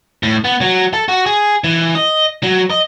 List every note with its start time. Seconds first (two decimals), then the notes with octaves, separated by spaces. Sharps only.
0.23 A2
0.44 B3
0.61 F#3
0.94 A4
1.08 F#4
1.26 G#4
1.64 E3
1.95 D#5
2.43 F#3
2.70 D#5